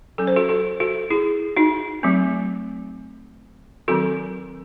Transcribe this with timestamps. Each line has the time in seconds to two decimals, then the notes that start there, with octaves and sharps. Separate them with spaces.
0.18 F#3 C#4 A4
0.27 C5
0.36 F#4 A4
0.49 F#4 A4
0.80 F#4 A4
1.10 E4 G#4
1.57 D#4 F#4
2.03 F#3 A3 C4
3.88 D#3 F#3 C4 F#4 A4